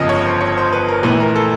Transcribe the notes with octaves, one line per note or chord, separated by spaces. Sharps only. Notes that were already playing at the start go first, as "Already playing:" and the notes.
Already playing: G1 F2 C#3 F3 D#5
C#5
C5
C#5
C5
B4
A#4
A#1 A2 E3 B4
A#4
A4